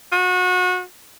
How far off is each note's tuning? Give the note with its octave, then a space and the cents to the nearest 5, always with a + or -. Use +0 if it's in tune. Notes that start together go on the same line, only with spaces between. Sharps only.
F#4 -30